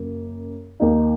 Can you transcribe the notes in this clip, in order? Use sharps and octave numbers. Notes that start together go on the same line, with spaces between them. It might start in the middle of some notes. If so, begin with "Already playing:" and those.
Already playing: F#2 C#3 A#3
D#2 D#3 A#3 D#4